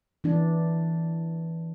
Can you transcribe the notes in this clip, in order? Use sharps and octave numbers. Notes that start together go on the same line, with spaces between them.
E3 D4